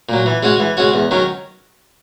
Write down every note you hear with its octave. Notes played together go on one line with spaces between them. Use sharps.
A#2 F#3
E3
G#3 C#4 F#4 C#5
E3
G#3 C#4 F#4 C#5
E2
D#3 F#3 C#4